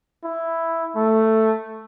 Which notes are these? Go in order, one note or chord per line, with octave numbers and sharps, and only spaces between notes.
E4
A3